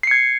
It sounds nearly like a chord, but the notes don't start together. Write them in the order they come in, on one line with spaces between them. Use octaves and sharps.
C7 C#7 G#6